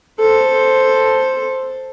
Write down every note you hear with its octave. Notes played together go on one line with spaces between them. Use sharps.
A4 C5